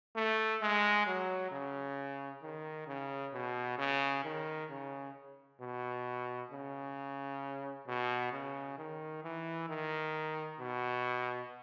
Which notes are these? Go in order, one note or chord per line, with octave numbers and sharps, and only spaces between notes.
A3
G#3
F#3
C#3
D#3
C#3
B2
C#3
D#3
C#3
B2
C#3
B2
C#3
D#3
E3
D#3
B2